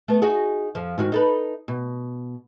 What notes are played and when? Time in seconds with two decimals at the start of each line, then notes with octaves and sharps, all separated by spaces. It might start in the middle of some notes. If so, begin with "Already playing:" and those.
0.08 A3 B3
0.22 D#4 F#4 G#4
0.75 F2 F3
0.98 G#2 D#3 F#4
1.12 D#4 A4 B4
1.68 B2